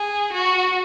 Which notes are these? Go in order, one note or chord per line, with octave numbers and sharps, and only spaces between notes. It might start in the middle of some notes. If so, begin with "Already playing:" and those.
Already playing: G#4
F#4